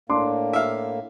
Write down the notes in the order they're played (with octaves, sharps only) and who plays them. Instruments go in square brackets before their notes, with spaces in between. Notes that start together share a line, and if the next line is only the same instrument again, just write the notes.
[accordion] A2 A#3 [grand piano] D4 C6 D6
[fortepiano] E5 F5